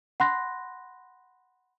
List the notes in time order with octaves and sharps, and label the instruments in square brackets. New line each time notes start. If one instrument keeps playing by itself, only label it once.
[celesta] F#5 B5 C6 F#6 A#6